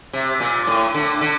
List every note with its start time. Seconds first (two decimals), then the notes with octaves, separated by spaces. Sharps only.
0.13 C3
0.40 A#2
0.67 A2
0.94 D3
1.21 D3